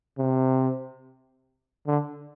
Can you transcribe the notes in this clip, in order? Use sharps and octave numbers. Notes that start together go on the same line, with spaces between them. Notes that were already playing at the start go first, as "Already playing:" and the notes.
C3
D3